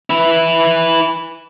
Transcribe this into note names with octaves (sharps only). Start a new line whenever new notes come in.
E4 B4